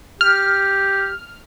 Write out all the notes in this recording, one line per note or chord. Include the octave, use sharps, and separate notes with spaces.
G4 F6